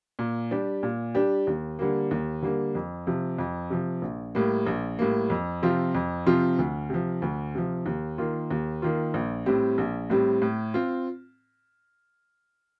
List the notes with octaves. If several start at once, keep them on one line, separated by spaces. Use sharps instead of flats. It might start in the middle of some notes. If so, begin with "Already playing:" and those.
A#2
G3 D4 G4
A#2
G3 D4 G4
D#2
D3 G3 A#3
D#2
D3 G3 A#3
F2
C3 F3
F2
C3 F3
A#1
A2 G3 A#3
A#1
A2 G3 A#3
F2
C3 F3 C4 F4
F2
C3 F3 C4 F4
D2
C3 F3
D2
C3 F3
D#2
D#3 A#3 F4
D#2
D#3 A#3 F4
A#1
A2 G3 C4 G4
A#1
A2 G3 C4 G4
A2
C4 F4